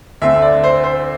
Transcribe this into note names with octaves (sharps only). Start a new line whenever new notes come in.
D2 D3 A3 C4 E5
D5
C5
C5